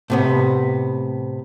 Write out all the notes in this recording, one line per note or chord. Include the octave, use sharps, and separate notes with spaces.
A2 C3 B3